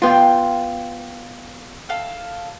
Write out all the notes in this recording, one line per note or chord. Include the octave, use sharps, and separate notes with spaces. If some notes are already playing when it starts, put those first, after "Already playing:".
B3 F4 F5 G5 C6
A4 F5